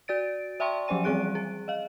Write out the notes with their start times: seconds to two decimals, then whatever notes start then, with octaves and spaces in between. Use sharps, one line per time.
0.08 F#4 D5 A6 D7
0.60 D5 E5 G5 A5 C6 C#6
0.88 F3 F#3 C#4 C5 G#5 D#7
1.04 E3 G3 C4 G#4 F#6 D7
1.35 G#4
1.68 D#5 F5